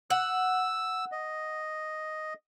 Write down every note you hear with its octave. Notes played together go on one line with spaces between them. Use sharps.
F#5 E6
D#5